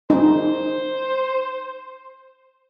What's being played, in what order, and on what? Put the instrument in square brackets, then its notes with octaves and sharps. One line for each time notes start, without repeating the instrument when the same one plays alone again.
[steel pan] D#4 [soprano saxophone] C5